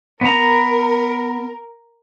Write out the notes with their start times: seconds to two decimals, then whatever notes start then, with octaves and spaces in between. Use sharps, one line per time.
0.21 B3 A#4 A#5